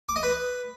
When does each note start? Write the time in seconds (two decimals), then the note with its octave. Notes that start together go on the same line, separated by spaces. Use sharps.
0.09 D6
0.16 D#5
0.23 B4